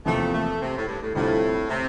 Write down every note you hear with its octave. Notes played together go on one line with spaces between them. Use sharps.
E2 C3 F3 A3 A#3
A3
C3
A2
G2
A2
D2 A2 C3 G3 C4 F4
C3